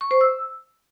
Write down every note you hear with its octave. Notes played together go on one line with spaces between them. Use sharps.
C#6
C5
E6